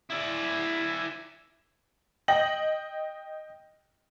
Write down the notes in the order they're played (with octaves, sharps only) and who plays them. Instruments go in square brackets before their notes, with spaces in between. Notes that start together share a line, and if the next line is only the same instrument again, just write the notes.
[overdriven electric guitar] E4 D5
[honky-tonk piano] D#5 G5 A#6 F#7